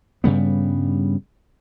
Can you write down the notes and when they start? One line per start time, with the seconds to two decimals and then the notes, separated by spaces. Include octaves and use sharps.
0.24 G2 C#3 G3 B3